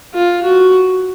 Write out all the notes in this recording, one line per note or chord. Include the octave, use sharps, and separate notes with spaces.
F4
F#4